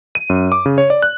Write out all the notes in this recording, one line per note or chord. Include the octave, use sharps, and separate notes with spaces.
D#7
F#2
D6
C#3
C#5
D5
F#6